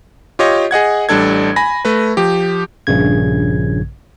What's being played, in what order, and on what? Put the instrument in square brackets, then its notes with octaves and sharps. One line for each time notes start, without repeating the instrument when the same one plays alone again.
[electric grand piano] F4 G4 C#5 D#5
G#4 D#5 F#5 G#6
A1 G3 D4 A4 G#6
G#5 B5 A#6
A3 B4
F3 G4
[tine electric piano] A#1 G2 C#3 G#6